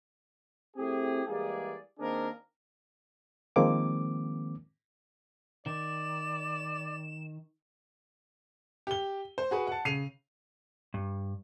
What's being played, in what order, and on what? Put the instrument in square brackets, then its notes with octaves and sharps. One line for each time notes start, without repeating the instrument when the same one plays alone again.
[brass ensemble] A3 C4 E4 G4 G#4
E3 G3 G#3 A#3 G#4 D5
D#3 A#3 C4 D4 G#4 A#4
[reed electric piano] D#3 F3 G#3 A#3 C4 D6
[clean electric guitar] D#3 [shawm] D5 [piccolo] E7
[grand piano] G4 G7
C5
F#4 G#4 B4
F#5 A5
C#3 C7 D#7 F7
[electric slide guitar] G2